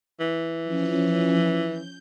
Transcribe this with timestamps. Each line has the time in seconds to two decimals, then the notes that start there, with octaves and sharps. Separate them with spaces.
0.20 E3
0.65 F3 C#4
1.68 G6